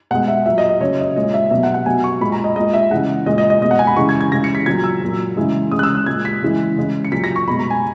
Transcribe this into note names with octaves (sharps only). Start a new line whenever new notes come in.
B2 G#3 F#5
E5
A#2 F#3 E5
D#5
D#5
C#3 F#3 C#5
D#5
A#2 G#3 D#5
E5
B2 F#3 E5
F#5
F#5
B2 F#3 G#5
C#6
A#2 G#3 B5
A#5
D#5
A#2 G#3 D#5
E5
C#3 E3 G#3 F#5
A#2 G#3 D#5
D#5
D#5
B2 G#3 D#5
F#5
G#5
B5
C#3 E3 G#3 C#6
G#6
G#6
C#3 E3 G#3 A#6
C#7
B6
A#2 F#3 G#6
E6
A#2 F#3
C#3 E3 G#3
C#3 G#3 D#6
F#6
E6
F#6
A#2 G#3 G#6
B6
C#3 E3 G#3
C#3 G#3
C#7
A#2 F#3 B6
A#6
C#6
B2 G#3 B5
A#5
G#5